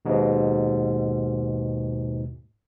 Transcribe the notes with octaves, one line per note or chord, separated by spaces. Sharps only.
D#2 G#2 B2